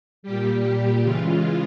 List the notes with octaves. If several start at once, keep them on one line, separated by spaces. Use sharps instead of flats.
A#2 G3 G4
G4
C#3 E3 G#3 F4